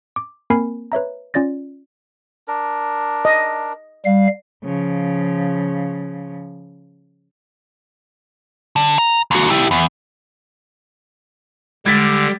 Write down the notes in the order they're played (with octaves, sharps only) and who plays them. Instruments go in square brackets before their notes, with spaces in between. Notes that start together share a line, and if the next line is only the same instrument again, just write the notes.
[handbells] D6
A#3 C4 A#4 G#5 B5 C7
B4 C#5 E5 A#5
C#4 F4 D5 A6 A#6
[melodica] D4 A#4
[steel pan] D#5
[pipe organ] G3 F5
[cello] C#3 F3
[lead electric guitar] D3
A#5
D#2 F#4
E4 G4
E2
[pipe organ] D3 [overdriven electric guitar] G3 [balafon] G#3 [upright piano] G#6 A6 B6